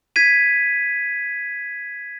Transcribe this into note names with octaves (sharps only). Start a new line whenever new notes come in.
G#6 B6 D#7